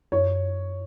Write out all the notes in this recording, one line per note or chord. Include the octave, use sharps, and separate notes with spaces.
F#2 C#5